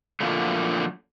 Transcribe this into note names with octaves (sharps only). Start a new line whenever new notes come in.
A#2 D3 F3 F#3 A3